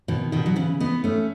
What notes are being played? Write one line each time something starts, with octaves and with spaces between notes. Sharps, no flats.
B2 D#3
B2 D#3
F#3
C#3 E3
B3 D#4
A3 C#4